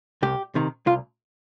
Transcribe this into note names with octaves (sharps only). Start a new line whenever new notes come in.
C2 G4
C3 D#3
C2 F4